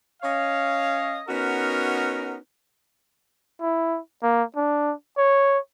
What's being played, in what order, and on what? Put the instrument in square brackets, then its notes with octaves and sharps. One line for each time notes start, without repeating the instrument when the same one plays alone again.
[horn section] C#4 C#5 D#5 F5
B3 C#4 D#4 F#4 A#4
[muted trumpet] E4
A#3
D4
C#5